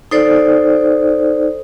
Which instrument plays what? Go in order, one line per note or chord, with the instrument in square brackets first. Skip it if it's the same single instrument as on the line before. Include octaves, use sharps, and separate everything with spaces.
[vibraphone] D#4 A4 C5 D5